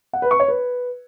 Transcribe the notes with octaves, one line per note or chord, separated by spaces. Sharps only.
F#5
B4
C#6
C#5
B4